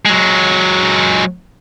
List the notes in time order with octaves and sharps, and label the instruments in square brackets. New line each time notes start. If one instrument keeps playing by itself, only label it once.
[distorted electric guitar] F#3 G#3